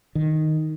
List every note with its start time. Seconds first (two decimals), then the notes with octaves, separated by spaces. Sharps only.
0.15 D#3